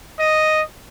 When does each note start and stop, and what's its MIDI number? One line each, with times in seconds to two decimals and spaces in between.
0.19 0.61 75